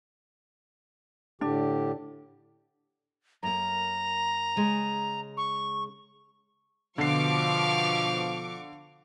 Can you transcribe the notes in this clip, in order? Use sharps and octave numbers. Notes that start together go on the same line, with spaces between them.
A2 D3 D4 G4
F#2 A#3 A#5
C#3 G#3
C#6
B2 D3 F3 F5 C#6 D6 C7